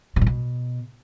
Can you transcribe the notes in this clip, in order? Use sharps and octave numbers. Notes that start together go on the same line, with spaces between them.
C3
A2
B2